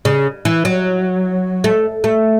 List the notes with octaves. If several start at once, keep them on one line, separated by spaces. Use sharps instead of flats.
C#3
E3
F#3
A3
A3